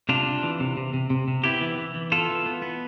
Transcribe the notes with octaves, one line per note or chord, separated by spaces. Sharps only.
C3 D4 F4
C3
E3
C3
C3
C3
C3
C3
B3 E4 G4
E3
E3
E3
B3 F4 A4
E3
B3
B3